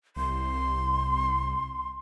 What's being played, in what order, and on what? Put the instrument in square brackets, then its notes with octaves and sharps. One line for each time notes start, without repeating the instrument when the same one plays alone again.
[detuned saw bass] C2 [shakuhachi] C6